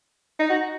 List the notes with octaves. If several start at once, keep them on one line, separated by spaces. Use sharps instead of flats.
D#4
F#4